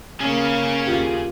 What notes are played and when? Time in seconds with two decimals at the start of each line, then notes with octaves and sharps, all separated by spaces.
0.20 C#3 A#3 C#4 G#4 F5
0.87 D#2 F4 G4